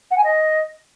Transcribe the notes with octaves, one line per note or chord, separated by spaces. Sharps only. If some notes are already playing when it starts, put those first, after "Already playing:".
F#5
G#5
D#5